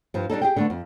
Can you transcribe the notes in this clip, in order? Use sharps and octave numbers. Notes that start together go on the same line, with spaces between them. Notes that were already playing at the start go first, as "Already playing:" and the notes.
G2 F3
G3 D4 D#4 A4
G4 G#4 G5
D3 A3 B3
F2